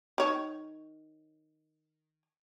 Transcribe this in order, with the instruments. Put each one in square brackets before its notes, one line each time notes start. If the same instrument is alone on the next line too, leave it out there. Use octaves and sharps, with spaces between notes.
[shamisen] D#3 C#5